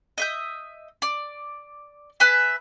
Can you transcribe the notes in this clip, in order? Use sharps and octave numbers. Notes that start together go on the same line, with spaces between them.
D#5 E5 G6
D5
B4 E5 G#5 B5